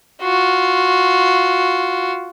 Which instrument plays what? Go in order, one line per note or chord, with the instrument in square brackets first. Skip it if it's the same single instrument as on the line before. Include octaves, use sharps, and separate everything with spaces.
[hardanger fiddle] F4 F#4